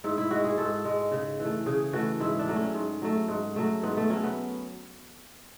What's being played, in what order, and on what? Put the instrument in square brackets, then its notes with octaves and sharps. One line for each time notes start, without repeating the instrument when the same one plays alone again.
[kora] G#2 E4
E4
G#3 F#4
G#4
G#2 A4
G#3
C#3
E3 A3
C#3 G#4
E3 A3 F#4
G#2 E4
D4
F#3 A3
C#4
G#2
F#3 A3
G#2
F#3 A3
G#2 B3
A3
F#3 A3 C#4
B3